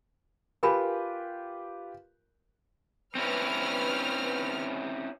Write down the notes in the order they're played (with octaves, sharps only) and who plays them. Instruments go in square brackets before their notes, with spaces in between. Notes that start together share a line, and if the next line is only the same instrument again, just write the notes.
[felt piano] F4 G4 B4 [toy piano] A#4 G#5 B5
[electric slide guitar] C4 C#4 E4 [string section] B4 F6